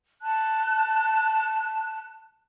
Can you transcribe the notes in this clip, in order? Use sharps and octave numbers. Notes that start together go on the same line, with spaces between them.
A5 F#6